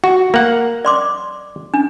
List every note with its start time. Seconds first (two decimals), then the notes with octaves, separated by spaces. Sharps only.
0.04 F#4
0.34 A#3 F#5
0.85 D5 C6 D6
1.74 D4